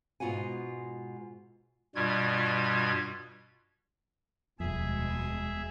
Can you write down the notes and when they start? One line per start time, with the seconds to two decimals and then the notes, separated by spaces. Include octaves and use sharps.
0.20 G#2 B2 F4 F#4 F#5 G#5
1.95 G2 B2 G3 F4 G#6
4.60 D#1 F2 B2 G#3 G#4 E5